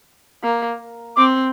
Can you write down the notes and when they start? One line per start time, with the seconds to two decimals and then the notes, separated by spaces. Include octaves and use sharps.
0.43 A#3
1.16 C4 D6